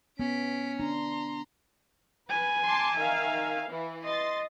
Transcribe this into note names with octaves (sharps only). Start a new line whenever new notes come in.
B3 C#4 B6 D7
D4 A#5 C6
B4 G#5
A5 C6 D6
D#3 E5 F5
E3
D#5 C6 A6